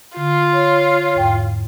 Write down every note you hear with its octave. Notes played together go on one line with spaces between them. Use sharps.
D3 F4
C#5
E2 G#2 G5